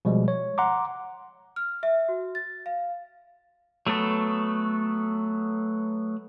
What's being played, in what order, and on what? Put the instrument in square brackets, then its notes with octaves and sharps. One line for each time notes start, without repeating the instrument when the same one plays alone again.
[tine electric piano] B2 F3 G3 G#3
C#5
F#5 A#5 C6 D6
[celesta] F6
E5
F#4
A6
F5
[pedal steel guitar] F#3 A3 B3 A4